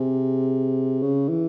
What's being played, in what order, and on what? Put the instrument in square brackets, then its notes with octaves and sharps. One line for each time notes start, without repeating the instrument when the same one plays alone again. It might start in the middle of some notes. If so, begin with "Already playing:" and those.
Already playing: [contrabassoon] C3 [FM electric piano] G#4
[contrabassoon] C#3
E3